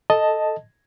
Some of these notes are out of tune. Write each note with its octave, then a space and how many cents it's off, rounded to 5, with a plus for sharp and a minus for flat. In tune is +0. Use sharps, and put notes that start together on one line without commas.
A4 +0 D#5 +0 A5 +0